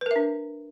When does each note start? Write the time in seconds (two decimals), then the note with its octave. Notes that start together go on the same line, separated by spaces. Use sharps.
0.01 B4
0.06 A#4
0.11 E5
0.16 D4